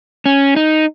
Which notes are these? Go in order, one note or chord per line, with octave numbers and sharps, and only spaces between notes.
C#4
D#4